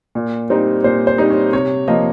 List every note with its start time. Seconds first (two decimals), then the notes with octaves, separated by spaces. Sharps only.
0.15 A#2
0.50 G3 C4 D#4
0.84 A#2 C5
1.07 C5
1.18 G3 C4 D#4
1.30 C#5
1.53 C3 C#5
1.88 F3 A#3 D#5